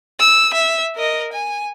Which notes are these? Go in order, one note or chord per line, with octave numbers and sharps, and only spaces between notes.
E6
E5
A#4 D#5
G#5